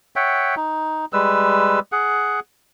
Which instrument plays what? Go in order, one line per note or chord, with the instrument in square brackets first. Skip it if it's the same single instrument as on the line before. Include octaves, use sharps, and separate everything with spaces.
[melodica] C#5 E5 F#5 G5
D#4
G3 G#3 B4 E6
G#4 F#5